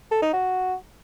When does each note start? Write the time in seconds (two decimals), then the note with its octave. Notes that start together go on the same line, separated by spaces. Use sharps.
0.11 A4
0.22 D#4
0.33 F#4